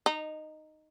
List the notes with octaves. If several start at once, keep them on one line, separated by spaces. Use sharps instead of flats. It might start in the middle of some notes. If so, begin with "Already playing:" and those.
D#4